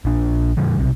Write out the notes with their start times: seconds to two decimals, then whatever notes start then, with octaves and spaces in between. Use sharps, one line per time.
0.05 A#1 D4
0.57 A#2 D3 F3 G#3
0.78 B1 C3